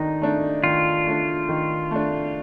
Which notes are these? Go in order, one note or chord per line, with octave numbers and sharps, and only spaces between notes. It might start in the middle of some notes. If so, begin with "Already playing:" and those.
Already playing: D#3 D4 D#4
A3 D4
D#3 F4
A3 D4
D#3
A3 D4